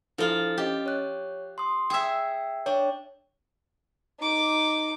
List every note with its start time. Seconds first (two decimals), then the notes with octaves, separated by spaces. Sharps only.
0.18 F3 D4 E4 F4 A4
0.58 C#4 G4 D#5
0.86 C#5 F#6
1.58 C6 D#6
1.90 G#4 E5 G5 E6
2.66 D4 C#5 G5
4.20 D#4 D6